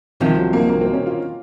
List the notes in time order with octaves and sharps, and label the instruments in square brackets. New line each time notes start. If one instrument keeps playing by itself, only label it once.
[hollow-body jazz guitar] C2 C3 F3 [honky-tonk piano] D#3
[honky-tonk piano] F#3
A#3
A#3
C4
C#4
F4